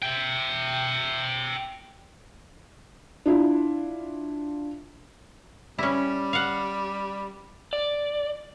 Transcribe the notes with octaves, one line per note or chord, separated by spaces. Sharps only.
E5 G5
D4 E4 F4
G3 C#4 E4
F5 F#5
D5